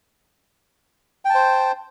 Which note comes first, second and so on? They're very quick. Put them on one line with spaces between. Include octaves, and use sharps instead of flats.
G5 A5 C5